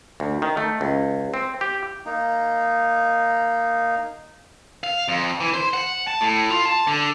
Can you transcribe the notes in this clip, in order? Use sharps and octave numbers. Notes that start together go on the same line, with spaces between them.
D2
D#3
A3
C#2
C4
G4
A#3 D#4
F5
F2
E3
C5
F#5
A5
A2
F4
A5
D3